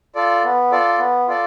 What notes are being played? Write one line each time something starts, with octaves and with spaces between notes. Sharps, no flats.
F4 A4 D5
B3
F4 A4 D5
B3
F4 A4 D5